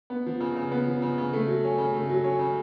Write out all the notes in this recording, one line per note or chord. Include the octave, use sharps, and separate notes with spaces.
B3
F3
C#3
C#3
B3
F3
C#3
C#3
A3
F#3
C#4
C#3
A3
F#3
C#4
C#3